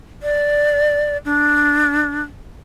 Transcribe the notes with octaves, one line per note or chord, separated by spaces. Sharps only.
D5
D4